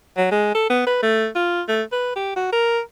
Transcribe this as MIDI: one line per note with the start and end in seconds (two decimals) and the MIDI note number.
0.17 0.28 54
0.31 0.50 56
0.54 0.67 69
0.70 0.82 59
0.87 0.99 71
1.02 1.27 57
1.35 1.62 65
1.68 1.82 57
1.92 2.16 71
2.16 2.34 67
2.36 2.49 66
2.52 2.80 70